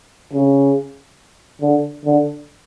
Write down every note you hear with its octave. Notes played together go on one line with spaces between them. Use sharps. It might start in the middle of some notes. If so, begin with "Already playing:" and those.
C#3
D3
D3